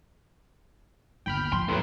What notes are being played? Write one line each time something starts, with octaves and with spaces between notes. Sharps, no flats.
G1 D#2 G5 B5 F6
F3 C6
E2 A2 F#3 A3 B4